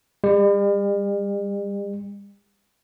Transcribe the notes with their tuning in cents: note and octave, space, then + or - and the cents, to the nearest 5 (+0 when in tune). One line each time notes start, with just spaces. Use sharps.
G3 +45